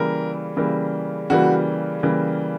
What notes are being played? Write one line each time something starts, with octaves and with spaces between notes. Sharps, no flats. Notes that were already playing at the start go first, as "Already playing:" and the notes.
Already playing: C#3 E3 G3 A#3 A#4
C#3 E3 G3 A#3
C#3 E3 G3 A#3 F#4
C#3 E3 G3 A#3